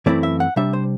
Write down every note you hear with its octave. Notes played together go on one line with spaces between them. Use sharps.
F#2 E3 A3 C4 E4 D5
E5
F#5
C3 G3 D4 E5
C5